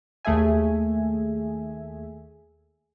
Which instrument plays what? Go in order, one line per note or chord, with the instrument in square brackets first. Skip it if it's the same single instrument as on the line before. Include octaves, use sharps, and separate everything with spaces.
[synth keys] D#2 A3 G#4 E5 G#5